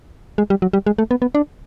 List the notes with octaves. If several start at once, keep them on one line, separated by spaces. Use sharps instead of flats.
G#3
G3
F#3
G3
G#3
A3
B3
B3
D4